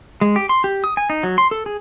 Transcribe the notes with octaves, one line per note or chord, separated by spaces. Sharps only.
G#3
G4
C6
G4
D#6
G#5
D#4
F#3
C6
A4
G#4